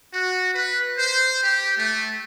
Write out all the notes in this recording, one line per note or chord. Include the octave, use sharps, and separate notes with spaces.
F#4
B4
C5
G4
A3